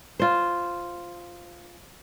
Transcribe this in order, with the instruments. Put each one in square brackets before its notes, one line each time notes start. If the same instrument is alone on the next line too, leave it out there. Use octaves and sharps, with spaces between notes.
[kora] F4 C5